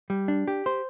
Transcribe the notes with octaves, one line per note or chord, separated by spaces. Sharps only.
G3
D4
G4
C5